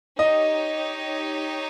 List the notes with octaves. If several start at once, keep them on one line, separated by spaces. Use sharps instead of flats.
D#4 G4 C#5 D#5